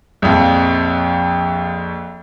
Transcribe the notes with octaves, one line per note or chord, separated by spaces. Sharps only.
A#1 F2